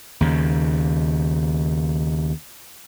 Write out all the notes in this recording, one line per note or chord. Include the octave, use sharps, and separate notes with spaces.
D#2 C#3